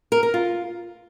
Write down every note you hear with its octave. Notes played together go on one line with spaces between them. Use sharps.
A#4
A#4
F4